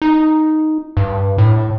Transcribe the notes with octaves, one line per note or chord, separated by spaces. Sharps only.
D#4
G2
A2